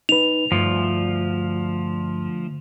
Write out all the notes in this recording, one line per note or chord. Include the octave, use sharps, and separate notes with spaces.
D#4 B4 F7
D2 G2 F3